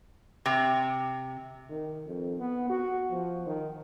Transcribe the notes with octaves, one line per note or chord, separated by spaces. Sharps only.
C3
D#3
F2
B3
F#4
F3
D#3